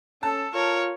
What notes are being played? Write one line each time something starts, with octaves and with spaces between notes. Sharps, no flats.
C#4 A4 A5
F4 A#4 C#5